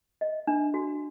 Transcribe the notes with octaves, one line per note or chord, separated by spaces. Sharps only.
D#5
D4
F#4